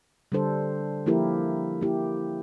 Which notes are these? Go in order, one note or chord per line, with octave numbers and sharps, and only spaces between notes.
D3 G3 D4 A4 C5
F3 A#3 E4 G4 A#4
A#3 E4 G4